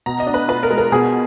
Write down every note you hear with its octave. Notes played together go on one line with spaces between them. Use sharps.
B2 A#5
D#5
D4
B4
F4 B4
A#4
G#3
A#4
B2 G#4